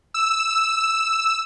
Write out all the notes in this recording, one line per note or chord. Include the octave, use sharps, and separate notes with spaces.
E6